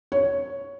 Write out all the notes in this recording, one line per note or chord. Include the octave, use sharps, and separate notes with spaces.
C#5